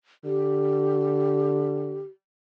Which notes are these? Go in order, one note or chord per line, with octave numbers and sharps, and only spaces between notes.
D3 G4